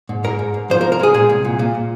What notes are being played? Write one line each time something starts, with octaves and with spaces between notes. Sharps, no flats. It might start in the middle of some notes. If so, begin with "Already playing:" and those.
G#2
G#2 A#4
G#2
G#2
F3 C5
A#4
C2
A#4
G#3 G#4
A#2 G#4
C2
A#2
A#2
A#2